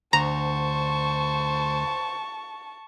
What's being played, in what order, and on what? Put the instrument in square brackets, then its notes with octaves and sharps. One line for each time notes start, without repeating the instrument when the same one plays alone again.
[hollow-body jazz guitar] D2 [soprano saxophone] C5 [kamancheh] A5 C#6 [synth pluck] A#5